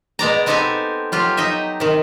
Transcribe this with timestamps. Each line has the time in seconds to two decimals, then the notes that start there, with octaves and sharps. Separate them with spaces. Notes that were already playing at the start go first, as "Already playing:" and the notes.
0.19 B2 G#3 D5 A#5
0.46 B3 C4 D#4 G4 A4 G#5
1.12 F#3 F4 G4
1.37 D#4 D#5 E5
1.80 C3 D#3